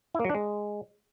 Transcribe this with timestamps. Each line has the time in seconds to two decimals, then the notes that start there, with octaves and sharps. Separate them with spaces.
0.15 E4
0.20 A#3
0.25 F#3
0.30 D4
0.35 G#3